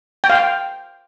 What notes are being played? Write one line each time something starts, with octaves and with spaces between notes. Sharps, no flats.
G5
F5
G5